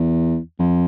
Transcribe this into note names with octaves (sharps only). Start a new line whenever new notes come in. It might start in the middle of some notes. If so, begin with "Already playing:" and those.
Already playing: E2
F2